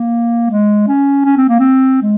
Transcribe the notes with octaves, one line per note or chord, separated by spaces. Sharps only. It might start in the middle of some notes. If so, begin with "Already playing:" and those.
Already playing: A#3
G#3
C#4
C#4
C4
A#3
C4
G#3